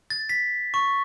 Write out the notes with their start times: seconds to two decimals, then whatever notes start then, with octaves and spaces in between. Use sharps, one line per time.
0.10 A6
0.29 B6
0.74 C#6